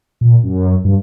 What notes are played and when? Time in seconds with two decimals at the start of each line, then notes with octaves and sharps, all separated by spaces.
0.21 A#2
0.43 F#2
0.84 G2